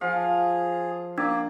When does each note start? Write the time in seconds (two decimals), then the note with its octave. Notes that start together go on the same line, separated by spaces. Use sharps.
0.01 F3 G#4 F5
1.18 A#3 D4 D5